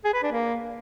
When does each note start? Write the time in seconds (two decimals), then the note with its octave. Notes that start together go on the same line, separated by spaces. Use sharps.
0.04 G#4
0.14 B4
0.23 D4
0.32 A#3